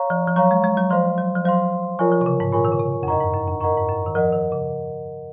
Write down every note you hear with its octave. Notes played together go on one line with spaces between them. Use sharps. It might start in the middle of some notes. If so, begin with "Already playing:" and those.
Already playing: C#5 F5 A#5 C#6
F3
F3
F#3 C#5 F5 A#5 C#6
G#3
G#3
F#3
F3 C5 F5 C6
F#3
F3
F#3 C5 F5 C6
F3 F4 A#4 C#5 G#5 C#6
F3
C3
C#3
G#2
A#2 F4 A#4 C#5 G#5 C#6
D#3
C#3
C3
F2
F#2 A#4 D#5 F#5 A#5 C#6
G#2
F#2
F2
F#2 A#4 D#5 F#5 A#5 C#6
G#2
F#2
D#3
F3 A#4 D#5 F#5
D#3
C#3